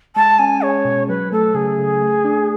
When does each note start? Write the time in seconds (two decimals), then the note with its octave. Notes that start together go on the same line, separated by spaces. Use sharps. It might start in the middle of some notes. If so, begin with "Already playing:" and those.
0.16 G#3 A5
0.39 C#4 G#5
0.62 G#4 C#5
0.85 B2
1.08 F#3 B4
1.32 A3 A4
1.54 C#3 G#4
1.79 C#3
2.02 A3
2.24 D4